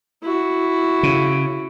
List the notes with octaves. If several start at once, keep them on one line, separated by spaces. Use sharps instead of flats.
E4 F#4
C#3